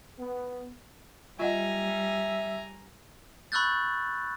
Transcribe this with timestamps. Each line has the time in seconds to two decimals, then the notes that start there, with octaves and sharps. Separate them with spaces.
0.19 B3
1.39 G3 F4 D#5 E5 F#5 G#5 A#5
3.52 B5 C#6 E6 F#6 G6 A6